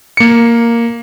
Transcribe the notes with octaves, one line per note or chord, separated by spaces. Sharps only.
A#3 C#7